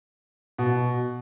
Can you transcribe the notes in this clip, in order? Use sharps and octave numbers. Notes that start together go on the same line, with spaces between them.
B2